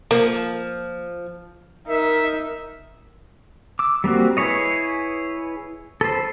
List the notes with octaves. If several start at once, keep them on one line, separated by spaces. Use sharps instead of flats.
F3 A#3
D#4 A#4 E5
D6 E6
G3 A#3 C4 F#4
E4 G#4 B4 C#5 D#5
A4 B4 C5